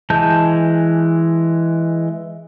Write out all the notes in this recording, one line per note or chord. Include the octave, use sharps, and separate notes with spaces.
E3 G#3 A5 G6